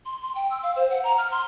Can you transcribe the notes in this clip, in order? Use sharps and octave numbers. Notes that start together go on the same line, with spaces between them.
C6
C6
G5
E6
F5
C5
F#5
A#5
F6
C6